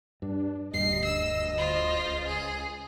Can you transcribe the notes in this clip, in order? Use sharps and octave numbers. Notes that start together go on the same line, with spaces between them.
G2 D4
D#1 D2 G2 D#5 C7
E6
F4 C5
C#2
G#4